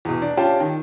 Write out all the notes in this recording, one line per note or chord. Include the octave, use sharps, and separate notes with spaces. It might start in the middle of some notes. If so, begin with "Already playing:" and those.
E2 B2
D4
C#4 F4 G4 G5 A5
D#3